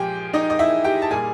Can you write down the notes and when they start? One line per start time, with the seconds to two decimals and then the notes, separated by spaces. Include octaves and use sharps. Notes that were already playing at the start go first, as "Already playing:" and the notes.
Already playing: A#2 F3 G#3 G4 G#4 G5
0.33 D#4 D#5
0.50 D#5
0.59 E4 E5
0.84 G4 G5
1.02 A5
1.10 A#2 G3 G#4 G#5